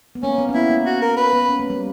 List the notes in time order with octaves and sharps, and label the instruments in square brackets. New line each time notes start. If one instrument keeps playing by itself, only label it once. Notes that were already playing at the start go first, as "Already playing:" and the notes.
[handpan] B3
[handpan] A#3 [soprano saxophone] C#4
[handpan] B3
C#4
[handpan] B3 [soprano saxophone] E4
[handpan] A#3
[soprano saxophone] F#4
A#4
B4
[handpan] B3
C#4
A#3
G3